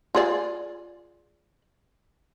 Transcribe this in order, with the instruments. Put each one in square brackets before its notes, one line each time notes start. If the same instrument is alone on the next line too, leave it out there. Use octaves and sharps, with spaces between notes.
[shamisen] F4 G#4 D5